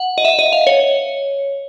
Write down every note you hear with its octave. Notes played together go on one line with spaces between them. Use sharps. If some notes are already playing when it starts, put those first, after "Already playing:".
Already playing: F#5
D#5
E5
D#5
F5
C#5